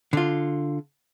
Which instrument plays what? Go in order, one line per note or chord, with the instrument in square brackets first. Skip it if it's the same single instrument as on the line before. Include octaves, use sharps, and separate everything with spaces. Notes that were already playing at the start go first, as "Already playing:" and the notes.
[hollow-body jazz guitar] D3 F4